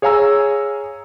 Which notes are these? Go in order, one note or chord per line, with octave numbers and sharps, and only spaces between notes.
G#4 C#5 F5 G#5 A#5 E6